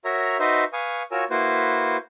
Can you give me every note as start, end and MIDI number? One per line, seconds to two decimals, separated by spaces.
0.05 0.37 66
0.05 0.37 70
0.05 0.37 73
0.05 0.37 76
0.05 0.37 82
0.39 0.64 63
0.39 0.64 66
0.39 0.64 71
0.39 0.64 72
0.39 0.64 75
0.39 0.64 76
0.73 1.03 71
0.73 1.03 77
0.73 1.03 80
0.73 1.03 85
0.73 1.03 87
1.11 1.24 65
1.11 1.24 66
1.11 1.24 70
1.11 1.24 73
1.11 1.24 80
1.11 1.24 88
1.30 1.97 58
1.30 1.97 64
1.30 1.97 66
1.30 1.97 71
1.30 1.97 72